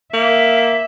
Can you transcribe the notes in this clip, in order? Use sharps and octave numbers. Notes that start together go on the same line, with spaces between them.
A#3 E5